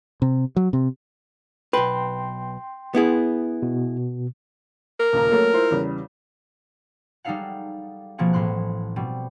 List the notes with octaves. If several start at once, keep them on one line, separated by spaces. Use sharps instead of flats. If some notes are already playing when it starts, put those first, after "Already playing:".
C3
F#3
C3
B1 B4 G5 C6
B3 E4 G#4
B2
A#4
D#1 C#2 A#5
F#3 A3 A#3
E4 F4 C5
E2 C#3 G3
G3 G#3 D#4 A4 F5 F#5
B2 F3 A#3 C4 G#4 F#5
A1 A2 C6 F#6
B2 G3 C4